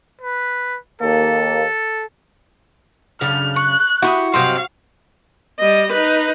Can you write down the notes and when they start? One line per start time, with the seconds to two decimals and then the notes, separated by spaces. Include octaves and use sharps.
0.22 B4
1.01 D#2 A#3 A4
3.21 F#2 C#3 D4 F6
3.56 C#6 F#6
4.02 E4 F#4 G4 B5 D#6
4.34 G2 C3 F#3 C5 D#5 F5 G5
5.59 G3 D#5
5.92 D#4 B4